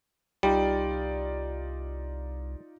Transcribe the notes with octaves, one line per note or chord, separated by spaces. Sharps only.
C2 G3 D#4 F4 D5